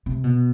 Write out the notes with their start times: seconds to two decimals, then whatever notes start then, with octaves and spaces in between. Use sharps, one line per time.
0.06 C3
0.24 B2